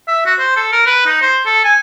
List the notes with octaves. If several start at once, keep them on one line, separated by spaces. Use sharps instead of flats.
E5
F#4
C5
A4
A#4
B4
D#4
C5
A4
G#5